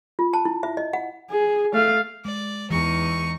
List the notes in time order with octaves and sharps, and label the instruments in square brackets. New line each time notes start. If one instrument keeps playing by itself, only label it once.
[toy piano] F4
A5
E4
E5
D#5
F#5
[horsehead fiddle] G#4
A3 F5
[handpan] G#3 [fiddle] D5
[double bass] E2 [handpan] E3 [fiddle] D#4 C#6